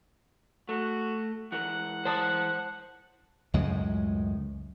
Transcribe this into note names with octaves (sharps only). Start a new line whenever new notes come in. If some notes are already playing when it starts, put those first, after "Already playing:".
A3 F#4
E3 G#3 A#4 F#5
C5 A5
C#2 F#2 A2 G#3